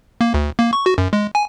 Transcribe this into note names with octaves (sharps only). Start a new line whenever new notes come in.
A#3
D2
A#3
C#6
F#4
F#2
G#3
G#5